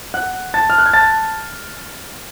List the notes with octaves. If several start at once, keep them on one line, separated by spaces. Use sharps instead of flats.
F#5 F#6
A5 A6
F6
F#6
G#6
A5 A6